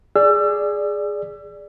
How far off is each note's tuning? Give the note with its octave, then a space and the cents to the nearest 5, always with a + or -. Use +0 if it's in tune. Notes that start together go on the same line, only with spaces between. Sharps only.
G#4 +0 D5 +0 E6 +35